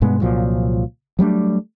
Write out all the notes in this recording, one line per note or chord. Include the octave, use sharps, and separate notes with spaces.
G2 B2 G#3 B3
C2 A#2 F3 F#3
F#3 G3 A3 D4